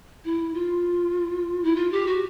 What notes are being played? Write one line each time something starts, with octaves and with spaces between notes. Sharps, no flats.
E4
F4
E4
F4
G4
F#4